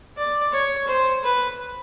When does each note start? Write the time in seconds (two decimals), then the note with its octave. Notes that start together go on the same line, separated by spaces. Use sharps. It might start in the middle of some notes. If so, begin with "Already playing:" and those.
0.17 D5
0.52 C#5
0.87 C5
1.23 B4